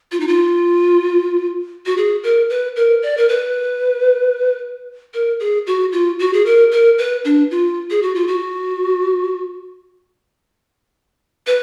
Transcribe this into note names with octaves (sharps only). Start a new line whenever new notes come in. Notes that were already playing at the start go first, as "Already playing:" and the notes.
F4
D#4
F4
F#4
G#4
A#4
B4
A#4
D5
A#4
B4
A#4
G#4
F#4
F4
F#4
G#4
A#4
A#4
B4
D4
F4
G#4
F#4
F4
F#4
B4